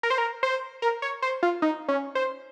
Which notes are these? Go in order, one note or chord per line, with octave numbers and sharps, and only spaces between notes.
A#4
C5
A#4
C5
A#4
C#5
C5
F4
D#4
C#4
C5